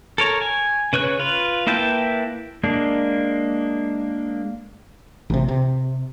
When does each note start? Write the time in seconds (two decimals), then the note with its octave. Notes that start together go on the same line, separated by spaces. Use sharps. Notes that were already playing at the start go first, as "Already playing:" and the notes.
0.18 A4 A#4 C#5
0.41 G#5
0.93 C#3 B4 C#5 F#6
1.19 F4 B4
1.67 A#3 E4 B4 G5 A5
2.63 G#3 A#3 D4
5.30 A1 C3
5.48 C3